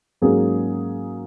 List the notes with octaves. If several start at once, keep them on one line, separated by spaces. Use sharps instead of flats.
G#2 F#3 A#3 C#4 G#4